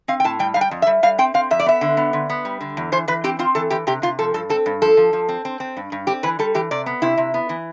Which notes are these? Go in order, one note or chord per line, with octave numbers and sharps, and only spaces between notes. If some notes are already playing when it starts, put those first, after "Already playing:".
C4 F5
G5
A2 A5
G3 G5
G3 F5
G5
F2
E5
G3
G3 F5
C4 G5
C4 F5
F2 E5
D5
B3 E5
D3
B3
D3
B3
G3
D3
E2
E3 C5
E3 B4
C4 G4
C4 F4
E3 A4
E3 G4
C3 G4
C3 F4
F3 A4
G2 A4
C4 A4
G2
F3 A4
F3
F3
C4
C4
C4
G2
G2
C4 G4
E3 B4
G3 A4
E3 G4
C3 D5
B3
C3 E4
C3
B3
E3